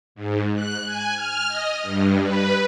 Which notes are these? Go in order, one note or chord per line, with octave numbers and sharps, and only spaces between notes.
G#2
F#6
G#5
F6
D#5
G2
B4